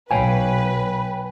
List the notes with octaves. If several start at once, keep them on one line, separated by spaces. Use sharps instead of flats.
B1 B4 C#5 F5 G5 G#5